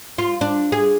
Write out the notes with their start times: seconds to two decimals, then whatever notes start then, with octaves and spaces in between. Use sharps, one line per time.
0.18 F4
0.41 D4
0.72 G#4